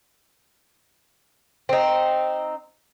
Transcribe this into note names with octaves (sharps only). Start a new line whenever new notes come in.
C4 D#4